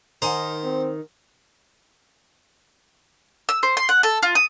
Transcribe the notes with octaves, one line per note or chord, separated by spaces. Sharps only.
D#3 C5 F#5 G#5 A#5
C4
E6
C5
C6
F#5
A4
F4
D#6